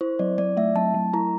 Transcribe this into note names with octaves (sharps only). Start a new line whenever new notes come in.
E4 C5
F#3 D5
F#3 D5
A3 E5
F#3 A5
F#3
E4 A#5